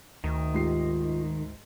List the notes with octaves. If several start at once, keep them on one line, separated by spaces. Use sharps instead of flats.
D2 D#3
G#2 F4 G4 C7